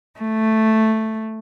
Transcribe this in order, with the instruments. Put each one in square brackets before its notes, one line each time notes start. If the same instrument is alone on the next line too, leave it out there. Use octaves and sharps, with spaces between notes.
[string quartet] A3